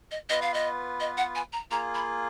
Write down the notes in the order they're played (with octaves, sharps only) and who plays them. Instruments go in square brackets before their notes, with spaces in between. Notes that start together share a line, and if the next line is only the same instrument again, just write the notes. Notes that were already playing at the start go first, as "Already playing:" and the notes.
[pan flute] D#5
[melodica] B3 F4 B4 [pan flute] D#5
[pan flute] F5
D#5
D#5
F#5
G#5
A#5
[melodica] A#3 F4 G#4 [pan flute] A#5
[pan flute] B5